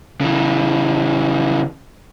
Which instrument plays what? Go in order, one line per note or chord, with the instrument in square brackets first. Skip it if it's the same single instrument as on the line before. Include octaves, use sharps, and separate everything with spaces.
[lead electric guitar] C#3 E3